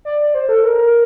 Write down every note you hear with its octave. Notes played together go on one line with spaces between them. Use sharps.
D5
C5
A4
A#4